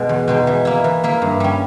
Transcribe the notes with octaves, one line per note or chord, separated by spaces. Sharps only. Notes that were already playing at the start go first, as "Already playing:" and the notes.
Already playing: B2 G#3 B3
E2
B2 G#3 D#4
E3
A#3 E4
E3
A#3 E4
G2
G3 C#4